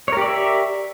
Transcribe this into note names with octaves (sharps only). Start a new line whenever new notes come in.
G4 A#4 C#5 D5 E5